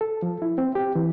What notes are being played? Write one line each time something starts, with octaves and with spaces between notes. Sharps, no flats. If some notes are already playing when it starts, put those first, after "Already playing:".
A4
F3
E4
C4
G4
E3